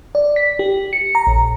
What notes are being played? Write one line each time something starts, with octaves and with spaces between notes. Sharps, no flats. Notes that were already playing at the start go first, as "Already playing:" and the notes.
D5
B6
G4
C#7
A#5
A#1